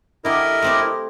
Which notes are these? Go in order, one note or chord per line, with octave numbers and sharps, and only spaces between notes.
D3 E4 G4 A#4 D#5
A3 C4 D5